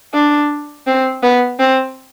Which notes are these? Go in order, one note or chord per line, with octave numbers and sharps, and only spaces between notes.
D4
C4
B3
C4